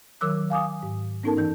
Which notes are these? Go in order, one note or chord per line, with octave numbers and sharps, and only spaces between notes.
D#3 F#3 A#4 D6 E6 F#6
F5 G#5 D6 D#6
G#2
B3 C#4 D#4 A4 A#4 A5
G2 E3 G6